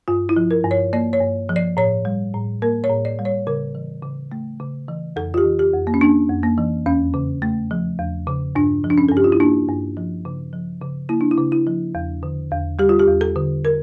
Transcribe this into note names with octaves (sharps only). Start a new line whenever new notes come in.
G2 F4
E4
F3
A#4
G2
C#5
A#3 D5
C#5
G2
F3
D5
A2 C#5
G3
A2
A#3 A#4
C#5
A2
D5
G3
C#5
C#3 A#4
E3
C#3
A3
C#3
E3
F2 A4
F4
G4
E3
G4
F2
A#3
C#4
A#3 D4
F2
A#3
E3
E2 C#4
C#3
A3
F3
E2
C#3
G2 D4
F3
D4
C#4
A4
G2
G4
F4
E4
A#3 D4
G2
F3
C#3
F3
C#3
A#3 E4
D4
E4
C#3
E4
F3
E2
D3
E2
G3 G4
F4
G4
E2
A4
D3
A#4